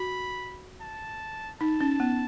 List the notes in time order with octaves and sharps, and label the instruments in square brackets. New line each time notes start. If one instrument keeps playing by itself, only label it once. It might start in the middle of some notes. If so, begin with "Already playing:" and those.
Already playing: [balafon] F#4 [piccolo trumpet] B5
[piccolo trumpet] A5
[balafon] D#4 [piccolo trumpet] A5
[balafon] C#4
B3